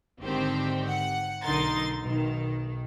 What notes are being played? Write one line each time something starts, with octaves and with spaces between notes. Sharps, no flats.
G#1 D3 D#3 C4 G4 C5
F#5
B1 D3 D#4 A#4 C6 A6
B1 D#3